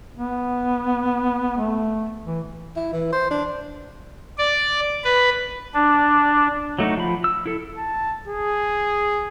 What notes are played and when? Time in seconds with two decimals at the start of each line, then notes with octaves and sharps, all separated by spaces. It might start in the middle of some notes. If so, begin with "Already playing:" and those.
0.17 B3
1.57 A3
2.25 E3
2.76 E4
2.93 E3
3.13 C5
3.31 D4
4.38 D5
5.04 B4
5.74 D4
6.79 F#3 A3 D#4 F#4
6.97 F3 B5
7.24 E6
7.46 E4 A4
7.77 A5
8.28 G#4